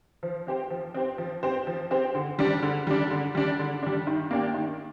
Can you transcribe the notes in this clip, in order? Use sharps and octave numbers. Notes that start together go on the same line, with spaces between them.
F3
C4 G4 C5
F3
C4 G4 C5
F3
C4 G4 C5
F3
C4 G4 C5
D3
G3 D4
D3
G3 D4
D3
G3 D4
D3
G3 D4
D#3
A#3 D4 G4
D#3